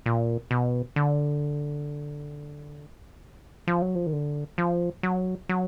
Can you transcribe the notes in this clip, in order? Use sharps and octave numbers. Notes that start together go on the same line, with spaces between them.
A#2
B2
D3
F3
F#3
F3
D#3
D3
F3
F#3
F#3